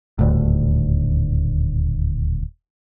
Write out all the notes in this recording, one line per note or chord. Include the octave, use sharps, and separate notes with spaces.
D#1 D2 A2